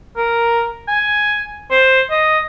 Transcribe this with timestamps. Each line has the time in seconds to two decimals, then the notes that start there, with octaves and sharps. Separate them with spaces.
0.17 A#4
0.88 G#5
1.71 C5
2.11 D#5